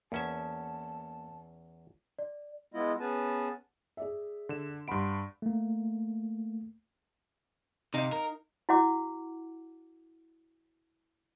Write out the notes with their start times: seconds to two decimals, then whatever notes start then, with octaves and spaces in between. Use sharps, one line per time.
0.12 E2 A#3 C#4 E5 A5
2.19 D5
2.74 G#3 B3 E4 F4 D#5
3.00 B3 C#4 G#4 B4 G#5 A5
3.97 G#4 D5 E5
4.49 D3 E7
4.88 G2 F#5 B5 C6 D7
5.42 A3 A#3
7.94 C3 D#4 F5
8.12 A#4
8.69 E4 F#4 F#5 D6